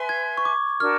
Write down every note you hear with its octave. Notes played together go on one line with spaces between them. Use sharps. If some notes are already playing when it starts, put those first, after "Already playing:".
Already playing: B4 E5 G#5 C6
G#6
C#6
D6
D4 F#4 A#4 F6